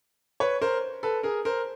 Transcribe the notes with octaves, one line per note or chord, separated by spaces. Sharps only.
B4 C#5
A#4 C5
A4 B4
G#4 A#4
A#4 C5